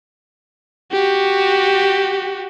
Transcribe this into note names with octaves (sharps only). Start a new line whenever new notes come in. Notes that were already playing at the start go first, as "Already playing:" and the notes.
F#4 G4